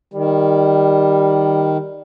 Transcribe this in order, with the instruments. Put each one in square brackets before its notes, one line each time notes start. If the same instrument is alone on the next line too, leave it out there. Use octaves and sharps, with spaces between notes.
[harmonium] D#3 [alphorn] G3